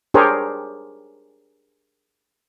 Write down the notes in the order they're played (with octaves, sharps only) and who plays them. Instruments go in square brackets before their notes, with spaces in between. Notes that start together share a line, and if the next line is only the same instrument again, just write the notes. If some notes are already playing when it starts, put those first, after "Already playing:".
[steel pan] D4 G4 G#4 A#4 C5 C#5